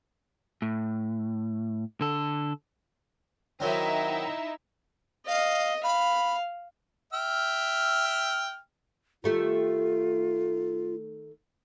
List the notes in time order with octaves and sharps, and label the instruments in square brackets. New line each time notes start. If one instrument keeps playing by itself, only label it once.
[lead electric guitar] A2
D3 A4
[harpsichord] D#3 F#3 C4 [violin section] D#4 E4 E5
[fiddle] D#5 [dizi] F5
[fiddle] F5 [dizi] B5
[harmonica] E5 G5 F6
[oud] D#3 A3 G4 [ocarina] F4